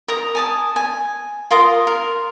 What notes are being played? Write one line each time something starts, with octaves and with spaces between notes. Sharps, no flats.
A#4 A#5 D#6
G#5 A5 D#6
G#5
F4 A#4 C6 D#6
A#4